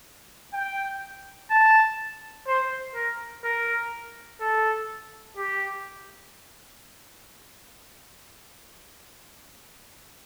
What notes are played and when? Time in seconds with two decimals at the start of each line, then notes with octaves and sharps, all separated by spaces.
0.54 G5
1.50 A5
2.47 C5
2.95 A#4
3.44 A#4
4.41 A4
5.37 G4